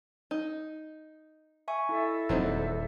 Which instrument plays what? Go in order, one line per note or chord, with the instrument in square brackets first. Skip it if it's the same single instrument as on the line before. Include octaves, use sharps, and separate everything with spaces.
[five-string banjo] D#4
[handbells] E5 G#5 C#6
[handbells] E4 [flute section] A4 D#5 E5
[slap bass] D#1 E2 [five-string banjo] F#3 C4 D#4